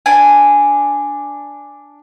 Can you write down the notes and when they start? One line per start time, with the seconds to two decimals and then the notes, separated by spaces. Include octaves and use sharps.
0.06 D4 G#5